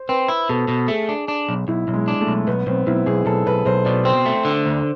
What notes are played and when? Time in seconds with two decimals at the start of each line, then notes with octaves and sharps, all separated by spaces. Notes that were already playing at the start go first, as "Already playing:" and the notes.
Already playing: C5
0.09 C4 B4
0.29 E4
0.49 B2 A4
0.68 B2
0.88 A3 G#4
1.09 D4
1.28 D4
1.49 B1
1.68 B1 E4
1.88 B1
1.94 G#3
2.08 D4
2.21 A3
2.27 B1
2.47 B1 B3
2.67 B1 C4
2.87 B1 E4
3.06 B1 G#4
3.26 B1 A4
3.47 B1 B4
3.66 B1 C5
3.85 B2 D5
4.05 C4 C5
4.26 A3
4.45 D3
4.66 D2